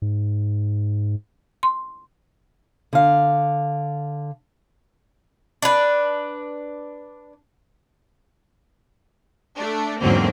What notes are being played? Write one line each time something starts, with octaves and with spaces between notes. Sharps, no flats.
G#2
C6
D3 F5
D4 B4
A3 D4
E2 G#2 D3 F#3 A#3 C4